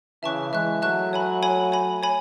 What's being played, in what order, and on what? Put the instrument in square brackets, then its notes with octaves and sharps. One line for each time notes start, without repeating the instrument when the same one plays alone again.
[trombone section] C#3 E3 [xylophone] E5 A5 C#6 F#6
[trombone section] E3 G#3 [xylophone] E5 A5 C#6 F#6
[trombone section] F#3 A3 [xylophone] E5 A5 C#6 F#6
[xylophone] C#5 G#5 B5
C#5 G#5 B5
C#5 G#5 B5
C#5 G#5 B5